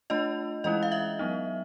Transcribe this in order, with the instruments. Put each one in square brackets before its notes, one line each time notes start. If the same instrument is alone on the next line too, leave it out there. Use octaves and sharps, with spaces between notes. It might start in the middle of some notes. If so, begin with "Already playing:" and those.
[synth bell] A3 D4 F4 D#5
E3 G#3 C#4 E4 D#5
F5
E5
F#3 B3 D#4